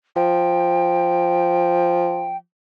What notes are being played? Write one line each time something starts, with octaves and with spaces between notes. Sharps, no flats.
F3 G5